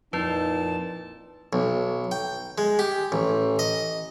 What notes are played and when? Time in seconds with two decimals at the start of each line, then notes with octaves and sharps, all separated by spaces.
0.13 F2 A#2 D#4 E4 B4 A5
1.53 B1
2.11 G5
2.58 G#3
2.79 G4
3.12 A1
3.59 D#5